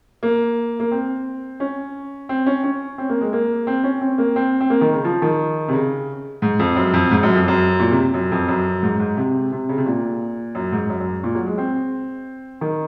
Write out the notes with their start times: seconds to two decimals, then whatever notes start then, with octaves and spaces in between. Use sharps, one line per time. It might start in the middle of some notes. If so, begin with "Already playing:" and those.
0.23 A#3
0.80 A#3
0.92 C4
1.60 C#4
2.29 C4
2.46 C#4
2.63 C#4
2.98 C4
3.09 A#3
3.21 G#3
3.33 A#3
3.67 C4
3.84 C#4
4.01 C4
4.18 A#3
4.36 C4
4.61 C4
4.70 A#3
4.81 D#3
4.93 C#3
5.04 F3
5.22 D#3
5.68 C3
5.73 C#3
6.42 G#2
6.59 F2
6.76 F#2
6.93 F2
7.11 G#2
7.23 F#2
7.36 F2
7.48 F#2
7.80 A#2
7.91 C3
8.14 F#2
8.32 F2
8.48 F#2
8.83 G#2
9.00 G#2
9.17 C3
9.52 C3
9.69 C#3
9.78 C3
9.86 A#2
10.55 F#2
10.72 G#2
10.90 F#2
11.00 F#2
11.24 A#2
11.35 F#3
11.46 G#3
11.58 C4
12.61 D#3